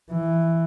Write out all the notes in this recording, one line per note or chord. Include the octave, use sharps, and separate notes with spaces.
E3